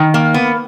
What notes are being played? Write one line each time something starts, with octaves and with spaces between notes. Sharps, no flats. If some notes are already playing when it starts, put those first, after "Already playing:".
Already playing: D#3
A#3
B3